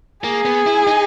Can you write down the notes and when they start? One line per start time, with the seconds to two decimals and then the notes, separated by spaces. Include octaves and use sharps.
0.24 A#3 G#4
0.45 B3
0.66 E4
0.87 D#4